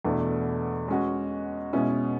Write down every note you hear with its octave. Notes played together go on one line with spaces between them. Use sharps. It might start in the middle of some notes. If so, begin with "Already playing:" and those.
E2 B2 A3 D4
G#3 C#4 F#4
B2 G#3 C#4 E4